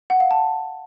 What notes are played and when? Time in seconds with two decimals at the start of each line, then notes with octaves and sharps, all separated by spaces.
0.10 F#5
0.20 F5
0.31 A5